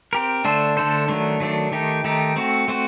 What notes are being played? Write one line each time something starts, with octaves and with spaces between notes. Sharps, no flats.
C4 G4 A#4
D3 A3 D4 A4 C5
D3 A3 D4 A4 C5
D#3 F#3 A3 D4
D#3 F#3 A3 D4
D#3 A3 D#4 G4
D#3 A3 D#4 G4
A3 C4 F#4
A3 C4 F#4